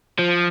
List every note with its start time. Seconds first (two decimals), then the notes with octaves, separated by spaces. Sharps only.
0.19 F3